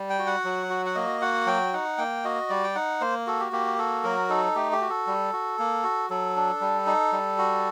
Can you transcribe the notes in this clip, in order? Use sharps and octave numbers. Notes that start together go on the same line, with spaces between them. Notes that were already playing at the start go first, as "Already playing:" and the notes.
Already playing: G3
G5
F#4
F#5
F#3
F#4
F#5
A#3 D#5
F#4 F#5
F#3 G5
D#4 F#5
A#3 G5
F#4 D#5
G3 D5
G5
D#4 F#5
A#3 C5
F#4 A4
G4
A#3 G4
F#4 A4
F#3 A#4
D#4 A4
A3 G4
G4
F#4
A4
G3
F#4
A#3
F#4
F#3 A4
D4
G3
D#4
G3
F#4